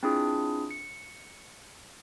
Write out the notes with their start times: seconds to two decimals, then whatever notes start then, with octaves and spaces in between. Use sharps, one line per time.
0.03 C4 D4 E4 F4 G#4
0.71 C#7